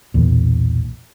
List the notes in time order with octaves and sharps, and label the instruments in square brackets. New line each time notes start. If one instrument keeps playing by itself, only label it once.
[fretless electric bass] B1 E2 A#2